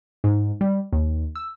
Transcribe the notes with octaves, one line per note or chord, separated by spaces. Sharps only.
G#2
G3
D#2
E6